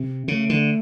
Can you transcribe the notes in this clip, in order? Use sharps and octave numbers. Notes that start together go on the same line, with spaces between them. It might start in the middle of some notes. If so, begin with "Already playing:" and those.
Already playing: C3
C#3 A3
D3